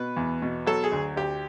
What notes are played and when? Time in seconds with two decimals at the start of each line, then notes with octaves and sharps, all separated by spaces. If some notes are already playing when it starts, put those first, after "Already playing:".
Already playing: B2 B4
0.17 E2
0.42 B2
0.67 F#3 A4
0.84 G#4
0.92 D2
1.16 D2 G4